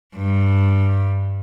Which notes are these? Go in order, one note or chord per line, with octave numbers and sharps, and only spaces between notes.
G2